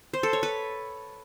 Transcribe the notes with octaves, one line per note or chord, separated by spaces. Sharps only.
C5
A4
C#5
B4